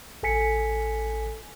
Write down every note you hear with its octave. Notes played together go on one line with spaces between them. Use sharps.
A1 A4 G#5 B6 C#7